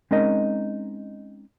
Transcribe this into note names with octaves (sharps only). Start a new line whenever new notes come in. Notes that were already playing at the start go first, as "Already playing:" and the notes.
G#3 C4 C#4 D#4 A#4 D#5